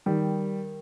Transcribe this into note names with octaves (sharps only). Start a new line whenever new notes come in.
D#3 G3